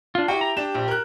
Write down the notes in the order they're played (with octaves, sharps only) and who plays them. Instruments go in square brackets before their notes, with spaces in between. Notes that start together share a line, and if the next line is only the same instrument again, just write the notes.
[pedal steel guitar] D4 F4
[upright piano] E4 G4 G5 [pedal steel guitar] F#4
[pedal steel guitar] A#5
[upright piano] D4 E7 [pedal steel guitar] G4
[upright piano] A#1
A#4 F#6